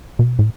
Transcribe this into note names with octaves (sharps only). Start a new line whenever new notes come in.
B2
A2